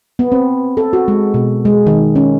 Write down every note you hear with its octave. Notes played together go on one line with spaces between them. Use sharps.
B3
C4
A4
F#4
G#3
B2
G#3
D#3
C#4